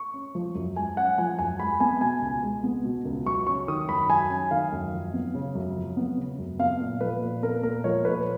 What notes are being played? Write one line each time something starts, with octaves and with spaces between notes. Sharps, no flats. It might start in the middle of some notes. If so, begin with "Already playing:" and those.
Already playing: C#6
C#4
F3
F#2
G#3 G#5
C#4 F#5
F3 G#5
F#2 G#5
G#3 B5
B3 G#5
B2 G#5
C#2
G#3
B3
B2
C#2
F#3 C#6
C#4 C#6
D#3 D#6
F#2 B5
F#3 G#5
C#4
D#3 F5
F#2
F3
B3
C#3
F#2
F3
B3
C#3
F#2
B3 F5
A#2
F3 B4
A#2
B3 A#4
A#2 A#4
F3 C#5
A#2 B4